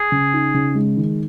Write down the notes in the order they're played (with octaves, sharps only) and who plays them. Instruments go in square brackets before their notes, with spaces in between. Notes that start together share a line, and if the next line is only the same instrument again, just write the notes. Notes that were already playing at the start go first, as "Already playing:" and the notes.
Already playing: [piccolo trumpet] G#4
[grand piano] C#3
D#4
C#3
G#3
D#3